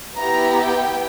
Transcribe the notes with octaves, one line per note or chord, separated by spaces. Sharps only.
B3 E4 G4 A#5
G5